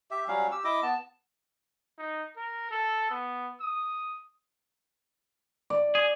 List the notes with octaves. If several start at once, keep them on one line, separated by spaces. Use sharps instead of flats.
G4 E5
F#3 G3 C#4 F5
G4 E6
E4 D#5 D6
B3 A5
D#4
A#4
A4
B3
D#6
D5
G#4